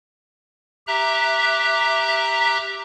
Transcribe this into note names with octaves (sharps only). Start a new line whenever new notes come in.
G4 E5 A#5 F#6